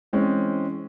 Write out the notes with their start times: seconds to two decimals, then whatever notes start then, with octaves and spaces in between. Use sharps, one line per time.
0.13 E3 G#3 C4 C#4